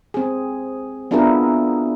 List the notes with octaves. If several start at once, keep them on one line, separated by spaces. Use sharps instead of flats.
C4 G#4
B3 D4 E4 F4 G#4 A#4